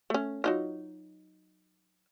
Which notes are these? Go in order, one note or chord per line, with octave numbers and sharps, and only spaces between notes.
A3 C#4
F#3 D#4 F4